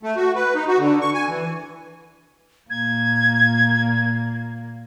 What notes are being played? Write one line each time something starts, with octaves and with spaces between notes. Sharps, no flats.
A3
F#4
B4
D#4
F#4
D3
C#6
G#5
E3
A#2 A#3 G#6